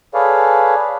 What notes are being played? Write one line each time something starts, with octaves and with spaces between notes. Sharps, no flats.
G#4 A4 B4 C#5 D5 F5